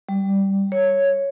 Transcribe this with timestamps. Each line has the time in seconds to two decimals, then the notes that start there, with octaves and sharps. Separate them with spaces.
0.09 G3
0.72 C#5